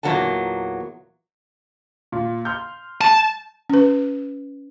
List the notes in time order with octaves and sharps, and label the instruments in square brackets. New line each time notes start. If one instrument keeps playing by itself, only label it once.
[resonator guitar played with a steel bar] E2 A#2 F#3 A#3 B3 A5
[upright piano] A#2
C6 F6 G6
[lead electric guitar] A5
[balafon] C#4 B4